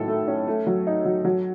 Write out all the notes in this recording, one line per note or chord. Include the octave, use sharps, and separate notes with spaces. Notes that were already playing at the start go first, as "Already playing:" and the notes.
Already playing: A2 D#3 F#3 A4
A3
C#4
A3
F#3
D#4
F#3
F#3